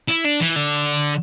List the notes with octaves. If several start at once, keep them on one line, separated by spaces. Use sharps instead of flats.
E4
D4
E3
D3